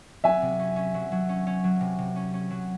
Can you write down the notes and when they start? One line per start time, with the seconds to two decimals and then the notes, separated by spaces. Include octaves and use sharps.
0.24 F#3 E5 G#5
0.42 C3
0.59 C#4
0.76 C#4
0.94 F#3
1.12 F#3
1.29 C#4
1.47 C#4
1.64 F#3
1.81 C3
1.99 C3
2.16 C#4
2.34 C#4
2.51 F#3